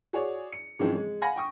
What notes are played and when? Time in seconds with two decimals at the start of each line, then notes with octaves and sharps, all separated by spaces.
0.13 F#4 G#4 C#5 D5
0.52 C#7
0.79 G#2 C#3 E3 F3 G#3 C4
0.95 G#3
1.21 F5 F#5 G#5 B5 A#6
1.36 G5 C#6 D#6